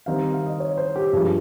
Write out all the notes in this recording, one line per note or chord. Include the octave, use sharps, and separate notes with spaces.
D#3 G3 C4 D#4 F5
F5
D#5
C#5
C5
G4
G2 F3 G#3